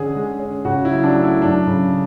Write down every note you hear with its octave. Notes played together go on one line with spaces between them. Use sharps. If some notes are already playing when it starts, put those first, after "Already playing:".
Already playing: D3 C#4 G#4
G#3
C#4
C#3 F#4
E4
F#3
D4
A3
E4
F#2 D4
C#3